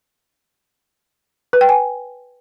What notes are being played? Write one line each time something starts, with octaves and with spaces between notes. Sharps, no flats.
B4
G5
G#5